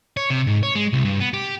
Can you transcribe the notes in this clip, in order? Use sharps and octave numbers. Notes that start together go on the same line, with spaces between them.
C#5
C3
G#2
C#5
G#3
C2
G2
B3
G4